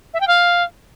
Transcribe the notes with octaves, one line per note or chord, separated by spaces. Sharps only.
E5
G5
F5